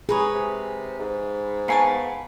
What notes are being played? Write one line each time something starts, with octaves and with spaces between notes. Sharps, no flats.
D#4 G#4 B4 C#5
C3
G#2
B3 A#4 C#5 F5 G#5 A5